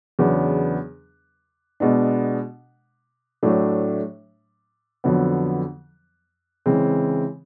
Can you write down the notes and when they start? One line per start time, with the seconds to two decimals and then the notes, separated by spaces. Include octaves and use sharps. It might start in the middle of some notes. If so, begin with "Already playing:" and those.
0.19 E2 C#3 F#3 B3 D4
1.80 B2 G#3 B3 D4
3.43 A2 F#3 A3 D4
5.04 F2 D3 F#3 B3
6.66 C#3 E3 G#3 C4